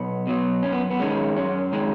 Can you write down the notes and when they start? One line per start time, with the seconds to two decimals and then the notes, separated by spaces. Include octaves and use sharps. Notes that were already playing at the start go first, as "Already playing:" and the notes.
Already playing: B1 B3
0.27 B2 F#3
0.62 F#2 C#4
0.72 B3
0.91 B3
1.00 D#3 G#3 C#4
1.36 F#2 C#4
1.72 D#3 G#3